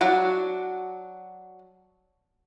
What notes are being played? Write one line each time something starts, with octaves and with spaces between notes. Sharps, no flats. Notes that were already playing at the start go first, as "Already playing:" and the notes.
F#3 D4 F#4